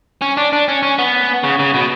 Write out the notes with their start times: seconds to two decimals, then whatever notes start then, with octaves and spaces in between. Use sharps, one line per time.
0.22 C#4
0.37 D4
0.53 D4
0.68 C#4
0.83 C#4
0.99 B3
1.44 C#3
1.59 C#3
1.74 B2